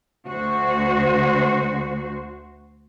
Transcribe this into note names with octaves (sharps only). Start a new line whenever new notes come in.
D2 F#4 C5